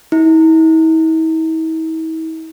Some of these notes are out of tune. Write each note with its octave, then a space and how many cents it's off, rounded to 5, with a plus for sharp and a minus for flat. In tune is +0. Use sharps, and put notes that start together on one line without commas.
E4 -45